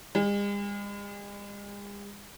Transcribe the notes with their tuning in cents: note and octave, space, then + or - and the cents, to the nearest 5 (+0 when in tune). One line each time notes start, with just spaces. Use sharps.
G#3 -45